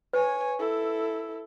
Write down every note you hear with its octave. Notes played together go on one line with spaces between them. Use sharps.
B4 C#5 G#5
E4 A4